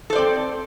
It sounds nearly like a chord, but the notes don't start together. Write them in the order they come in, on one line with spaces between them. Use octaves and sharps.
A4 C5 D5 C4